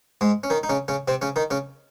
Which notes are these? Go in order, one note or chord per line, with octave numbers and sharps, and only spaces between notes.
G#2 G#3
C#4
D#3 D#4
D#4
C#3 C#4
C#3 C#4
C3 C4
C#3 C#4
D#3 D#4
C#3 C#4